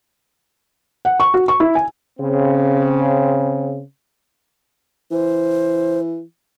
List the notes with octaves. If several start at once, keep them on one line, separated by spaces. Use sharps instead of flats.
F#5
C#6
F#4
C#6
E4
G#5
C#3 C4
E3 C5